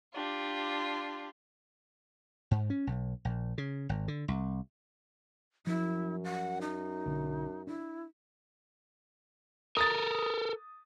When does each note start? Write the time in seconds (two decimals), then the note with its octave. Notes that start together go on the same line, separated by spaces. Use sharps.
0.15 D4 F4 G4
2.51 G#2
2.70 C#4
2.87 B1
3.25 A#1
3.58 C#3
3.89 G#1
4.08 D3
4.28 C2
5.67 F#2 F3 E4
6.24 F#5
6.61 D#4
7.06 B1 D3
7.67 D4 E4
9.77 A4 A#4 D#6 A6